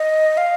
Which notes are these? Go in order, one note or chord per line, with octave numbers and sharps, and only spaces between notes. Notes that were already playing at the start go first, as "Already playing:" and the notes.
Already playing: D#5
F5